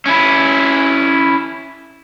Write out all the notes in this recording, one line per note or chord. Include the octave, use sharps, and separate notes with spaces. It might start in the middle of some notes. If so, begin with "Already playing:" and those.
C#4 E4